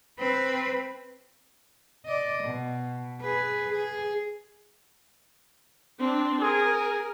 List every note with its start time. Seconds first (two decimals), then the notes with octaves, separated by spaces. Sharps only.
0.19 C4 B4
2.05 D5 D#5
2.44 B2
3.21 G#4 B4
3.73 G#4
6.00 C4 D4
6.41 G#4 A#4